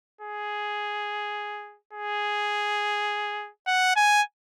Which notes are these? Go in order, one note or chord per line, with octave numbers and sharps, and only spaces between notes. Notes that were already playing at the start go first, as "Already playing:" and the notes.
G#4
G#4
F#5
G#5